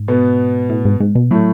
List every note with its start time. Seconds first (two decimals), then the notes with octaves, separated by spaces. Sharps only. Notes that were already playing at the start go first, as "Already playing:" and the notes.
Already playing: G#2
0.08 B2 B3
0.69 A2
0.85 G#2
1.00 G#2
1.15 B2
1.31 A2 F#3 A3